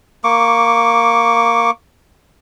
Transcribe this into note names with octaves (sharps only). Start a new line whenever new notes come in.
A#3 C#6 D6